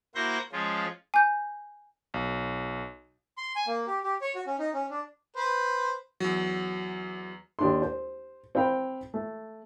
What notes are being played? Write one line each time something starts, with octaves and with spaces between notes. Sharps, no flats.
A#3 E4 F#4 C5 G6 A#6
F3 G#3 C#4 F4
G#5 G6
B1
C6
G#5
A#3
G4
G4
C#5
F#4
C#4
D#4
C#4
D4
B4 C5
E2 F#3
D#2 D4 C6
C5
C4 C5 F5 G5 B5
A3